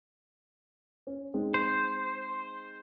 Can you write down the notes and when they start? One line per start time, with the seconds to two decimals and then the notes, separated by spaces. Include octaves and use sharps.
1.07 C#4
1.34 G#3 C4 D#4
1.54 C5